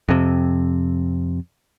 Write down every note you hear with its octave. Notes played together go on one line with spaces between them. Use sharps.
F2 C3